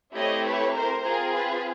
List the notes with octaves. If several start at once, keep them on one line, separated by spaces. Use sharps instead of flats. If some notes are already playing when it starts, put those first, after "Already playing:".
A3 C4 E4 G4 C#5 D#5
B4 C#5
A#4 C5
C4 F4 G#4 A#4
B4